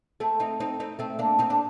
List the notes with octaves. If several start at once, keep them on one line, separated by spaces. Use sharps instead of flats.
A3 C4
C4 D#4
C4 D#4
C4 D#4
A3 C4
A#3 D4
C4 D#4
D4